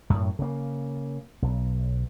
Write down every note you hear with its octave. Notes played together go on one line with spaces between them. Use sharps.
F#2 A2
C#3 A#3
B1